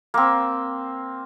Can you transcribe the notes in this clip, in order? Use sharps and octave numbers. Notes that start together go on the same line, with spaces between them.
A#3 C4